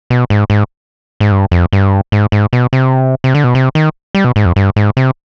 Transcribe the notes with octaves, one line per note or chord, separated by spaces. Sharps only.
B2
G#2
G#2
G#2
G2
F2
G2
G#2
G#2
B2
C3
C3
D3
B2
C3
D#3
G3
B2
G#2
F2
G2
G#2
C3